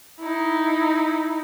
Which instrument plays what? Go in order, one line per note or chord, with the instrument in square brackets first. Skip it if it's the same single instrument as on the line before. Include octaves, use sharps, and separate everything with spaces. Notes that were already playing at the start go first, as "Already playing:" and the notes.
[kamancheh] D#4 E4